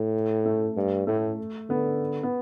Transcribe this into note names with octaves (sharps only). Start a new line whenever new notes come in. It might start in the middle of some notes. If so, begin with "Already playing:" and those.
Already playing: A2
A3
G2
A2 A3
D3 B3
B3